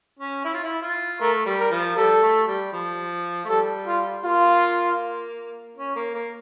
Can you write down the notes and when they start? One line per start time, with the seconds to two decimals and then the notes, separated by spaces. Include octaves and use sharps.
0.19 C#4
0.45 E4
0.54 F4
0.63 E4
0.82 F4
1.20 A3 A#4
1.45 G3
1.59 A#4
1.71 F3
1.96 G3 A4
2.22 A3
2.47 G3
2.73 F3
3.45 A3
3.49 G3 A4
3.87 F4
4.25 A#3 F4
5.77 C#4
5.96 A#3
6.15 A#3